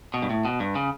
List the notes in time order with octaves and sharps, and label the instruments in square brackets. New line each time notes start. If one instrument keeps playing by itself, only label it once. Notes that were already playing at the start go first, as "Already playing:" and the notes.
[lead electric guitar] B2
G2
A2
B2
G2
C#3